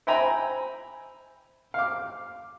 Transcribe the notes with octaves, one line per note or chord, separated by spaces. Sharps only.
C5 E5 G5 G#5 A#5 B5
F5 D6